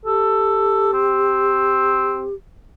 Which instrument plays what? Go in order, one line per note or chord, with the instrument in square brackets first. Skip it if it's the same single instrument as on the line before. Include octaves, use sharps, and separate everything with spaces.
[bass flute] G4 [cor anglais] A4
[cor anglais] C4